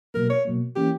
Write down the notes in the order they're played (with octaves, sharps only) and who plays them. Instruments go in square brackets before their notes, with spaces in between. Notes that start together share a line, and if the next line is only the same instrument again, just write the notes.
[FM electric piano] B2 F#3 A#3 [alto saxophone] A#4
[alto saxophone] C#5
[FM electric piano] B2 F#3 A#3
[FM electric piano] E3 A#3 C#4 [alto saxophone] G4